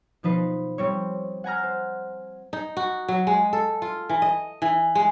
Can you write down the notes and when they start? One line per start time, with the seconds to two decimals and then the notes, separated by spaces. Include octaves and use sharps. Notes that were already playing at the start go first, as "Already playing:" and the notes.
0.23 B2 F3 D#4 B4 C5 C7
0.78 G3 C4 C#5
1.44 F#5 G#5 A#5 F6
1.63 C5
2.53 D#4
2.77 F#4
3.09 F#3
3.27 G#3
3.53 A4
3.82 F4
4.09 E3
4.22 D#5
4.62 E3
4.95 G#3